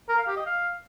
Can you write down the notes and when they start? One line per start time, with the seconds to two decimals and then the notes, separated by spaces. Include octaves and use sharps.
0.09 A#4
0.18 F5
0.27 G4
0.37 D#5
0.46 F5